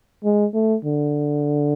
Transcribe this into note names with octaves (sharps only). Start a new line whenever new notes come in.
G#3
A3
D3